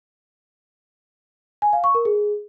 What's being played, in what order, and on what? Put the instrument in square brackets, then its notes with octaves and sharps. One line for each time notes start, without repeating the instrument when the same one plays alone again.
[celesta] G#5
F5
C#6
A#4
G#4